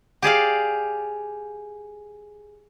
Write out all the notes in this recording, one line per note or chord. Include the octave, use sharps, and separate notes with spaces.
G4 G#4 D5 F5